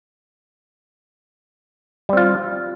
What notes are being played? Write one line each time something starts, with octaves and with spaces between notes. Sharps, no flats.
G3 C4 F4